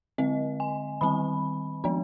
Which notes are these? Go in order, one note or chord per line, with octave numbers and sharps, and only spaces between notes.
D3 G#3 C4 D#5
G#5
D#3 G3 C4 B5
F3 G#3 B3 D4